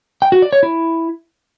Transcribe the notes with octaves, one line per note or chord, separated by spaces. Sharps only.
G5
F#4
D5
C#5
E4